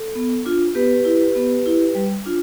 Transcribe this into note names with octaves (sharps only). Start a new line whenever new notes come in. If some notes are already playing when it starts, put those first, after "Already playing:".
Already playing: A4
B3
D4 F4
B3 G4 B4
E4
B3
E4
G3
D4 F4